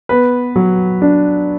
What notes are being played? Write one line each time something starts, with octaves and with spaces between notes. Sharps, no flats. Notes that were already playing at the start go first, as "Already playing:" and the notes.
B3 B4
F#3
D4